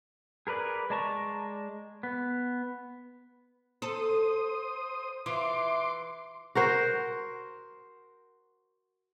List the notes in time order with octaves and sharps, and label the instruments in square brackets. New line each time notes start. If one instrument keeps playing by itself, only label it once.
[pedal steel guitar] G#4 A#4 B4 D5
G#3 D5 A5 A#5 C#6
B3
[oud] A4 [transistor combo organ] C5 D#6
[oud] E3 F4 [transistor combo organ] C6 D6
[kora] F#4 A#4 C5